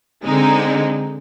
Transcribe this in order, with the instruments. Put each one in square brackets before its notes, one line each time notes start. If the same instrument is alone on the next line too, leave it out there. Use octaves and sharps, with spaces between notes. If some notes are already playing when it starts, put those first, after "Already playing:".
[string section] D3 G#3 C4 D#4